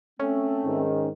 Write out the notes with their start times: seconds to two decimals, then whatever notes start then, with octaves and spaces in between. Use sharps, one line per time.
0.20 A3 C4 C#4
0.65 G#2 D#3